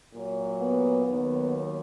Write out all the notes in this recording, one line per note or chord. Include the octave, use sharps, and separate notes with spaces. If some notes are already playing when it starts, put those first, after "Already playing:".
A#2 F#3
B3
D#2 D#3 F#3 B3